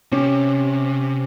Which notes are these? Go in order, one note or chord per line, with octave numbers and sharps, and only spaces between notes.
C3 C#4